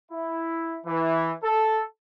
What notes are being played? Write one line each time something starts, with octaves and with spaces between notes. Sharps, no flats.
E4
E3
A4